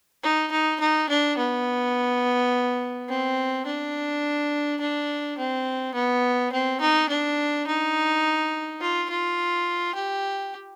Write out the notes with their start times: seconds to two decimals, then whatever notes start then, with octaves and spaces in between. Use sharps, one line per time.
0.23 D#4
0.51 D#4
0.80 D#4
1.09 D4
1.38 B3
3.09 C4
3.66 D4
4.81 D4
5.38 C4
5.94 B3
6.52 C4
6.81 D#4
7.09 D4
7.67 D#4
8.81 F4
9.10 F4
9.95 G4